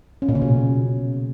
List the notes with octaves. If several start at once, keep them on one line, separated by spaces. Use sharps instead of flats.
C#4
A#2
C#3
B2